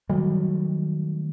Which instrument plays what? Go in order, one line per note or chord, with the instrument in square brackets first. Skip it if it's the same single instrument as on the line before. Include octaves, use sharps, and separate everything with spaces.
[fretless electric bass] D#3 G3 A3 [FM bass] F#3